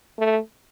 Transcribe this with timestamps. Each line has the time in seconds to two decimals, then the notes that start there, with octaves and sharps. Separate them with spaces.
0.19 A3